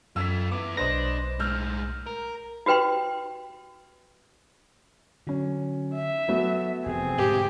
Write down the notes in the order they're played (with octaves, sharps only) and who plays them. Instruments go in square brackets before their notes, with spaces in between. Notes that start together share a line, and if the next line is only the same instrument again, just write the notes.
[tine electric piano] F#2 [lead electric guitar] F4 A4 [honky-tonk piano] E6 G#6 B6
[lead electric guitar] B3 E4 [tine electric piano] D6
[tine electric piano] B1 A#6 [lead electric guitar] D4 [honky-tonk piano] B4 C5 D#5
[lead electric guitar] A2 G#3 [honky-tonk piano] E6 F6 G6
[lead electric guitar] A#4
[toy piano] F#4 G4 B4 G5 C6
[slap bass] D3 [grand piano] F#3 C#4
[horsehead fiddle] E5
[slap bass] F#3 [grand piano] A3 B3 F#4
[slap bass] F1 E2 C3 [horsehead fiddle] C4 G#4
[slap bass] G#2 B2 D3 [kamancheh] G4